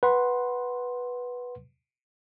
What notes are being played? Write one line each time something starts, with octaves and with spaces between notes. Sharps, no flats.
B4 F#5 C6